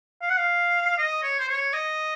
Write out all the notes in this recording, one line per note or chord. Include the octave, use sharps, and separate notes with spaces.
F5
F#5
F5
D#5
C#5
C5
C#5
D#5